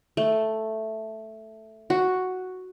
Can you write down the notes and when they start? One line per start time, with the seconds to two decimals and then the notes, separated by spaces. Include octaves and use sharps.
0.17 A3
1.90 F#4